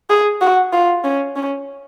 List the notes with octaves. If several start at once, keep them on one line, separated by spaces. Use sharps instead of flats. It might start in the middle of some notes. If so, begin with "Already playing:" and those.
G#4
F#4
F4
C#4
C#4